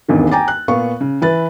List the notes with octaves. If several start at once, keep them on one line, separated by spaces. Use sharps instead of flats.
D#1 G#1 E2 G2 D#3
G5 G#5 A#5 D6 A6
F#6
A#2 B3 F5 C#6
C#3
E3 B4 A6